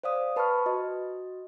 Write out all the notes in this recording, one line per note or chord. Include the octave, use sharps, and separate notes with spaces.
C5 D5 F5 D#6
B4 A5 B5 C#6 F6
F#4 D#5